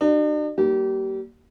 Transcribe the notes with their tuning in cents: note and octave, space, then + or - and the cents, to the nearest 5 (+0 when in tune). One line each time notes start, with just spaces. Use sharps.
D4 +45 F#4 +35
G3 -25 A#3 +5 G4 -30